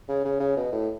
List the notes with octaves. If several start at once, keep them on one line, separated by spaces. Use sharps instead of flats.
C#3
C#3
C#3
B2
A2